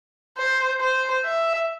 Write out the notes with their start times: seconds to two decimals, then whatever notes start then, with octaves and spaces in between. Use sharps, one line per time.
0.38 C5
0.80 C5
1.25 E5